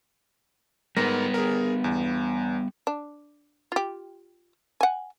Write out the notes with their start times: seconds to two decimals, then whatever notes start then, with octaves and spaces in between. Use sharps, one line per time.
0.97 G#2 G3 B3 A#4 B4 A#6
1.34 G#4 A#4
1.84 E2
2.87 D4
3.72 F4 G4
4.81 F#5 G#5